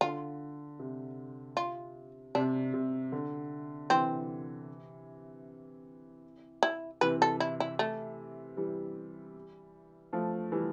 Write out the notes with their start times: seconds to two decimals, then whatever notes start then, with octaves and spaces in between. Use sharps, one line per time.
0.01 D3 F4
0.79 C3
1.57 F4
2.35 C3 D4
2.74 C3
3.12 D3
3.90 C3 E3 C4
6.63 E4
7.01 C3 E3 B4
7.22 A4
7.40 E4
7.60 E4
7.79 A3
8.57 E3 G3
10.13 F3 A3
10.52 E3 G3